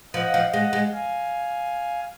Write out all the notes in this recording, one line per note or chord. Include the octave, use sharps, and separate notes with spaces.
F3 D#5 F#5
F3
G#3 D#5 F#5
G#3
F5 G#5